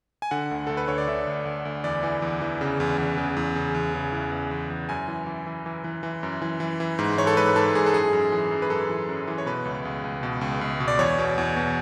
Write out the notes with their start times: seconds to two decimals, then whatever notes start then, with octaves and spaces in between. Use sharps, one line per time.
0.22 G#5
0.31 D3 F#5
0.51 D2
0.67 D2 A4
0.77 B4
0.88 D2 C#5
0.98 D5
1.08 D3 E5
1.27 D2
1.45 D2
1.65 D2
1.84 E2 D5
2.03 E3
2.22 E2
2.42 E3
2.61 C#3
2.80 E2
2.98 E2
3.18 C#3
3.37 E2
3.56 C#3
3.74 E2
3.94 C#3
4.12 E3
4.32 E2
4.51 E2
4.70 E2
4.89 F#2 G#5
5.08 E3
5.27 E3
5.46 E3
5.66 E3
5.84 E3
6.03 E3
6.23 F#2
6.42 E3
6.60 E3
6.80 E3
6.99 G#2
7.18 E3 C#5
7.27 A4
7.37 G#2 B4
7.56 G#2 A4
7.75 G#2 G#4
7.86 A4
7.94 F#2 G#4
8.13 F#2
8.32 E3
8.51 F#2
8.62 B4
8.70 F#2 A4
8.89 E3
9.09 F#2
9.27 E3
9.38 C#5
9.46 B2 B4
9.65 C#2
9.85 C#2
10.04 C#2
10.23 B2
10.41 C#2
10.61 C#2
10.80 B2
10.88 D5
10.99 E2 C#5
11.18 B2
11.38 E2
11.57 B2